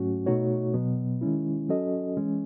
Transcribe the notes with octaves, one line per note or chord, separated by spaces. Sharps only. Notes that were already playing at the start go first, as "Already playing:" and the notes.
Already playing: G#2 F#3 A3 C#4 F#4
B2 A3 D#4 F#4 C#5
B2 F#3 B3
D#3 G#3 C#4 E4
F#3 C#4 F#4 A4 D#5
E3 G#3 C#4